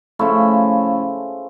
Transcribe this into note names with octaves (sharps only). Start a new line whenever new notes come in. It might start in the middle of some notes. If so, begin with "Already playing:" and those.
C#3 F3 A3 E4